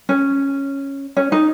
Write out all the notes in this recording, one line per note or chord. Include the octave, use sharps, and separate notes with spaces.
C#4
C#4
D#4